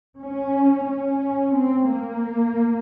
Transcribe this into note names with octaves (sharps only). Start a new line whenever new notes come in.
C#4
C#4
C4
A#3